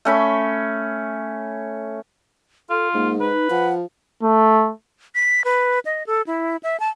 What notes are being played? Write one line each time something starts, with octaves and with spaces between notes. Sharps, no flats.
A3 C#4 B5
F4 A4
G#2 A#3
D#4 B4
F3 F#5
A3
B6
B4
D#5
A4
E4
E5
A5